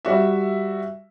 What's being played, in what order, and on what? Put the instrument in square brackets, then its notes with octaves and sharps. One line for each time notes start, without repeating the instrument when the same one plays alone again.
[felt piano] G3 F#4 E5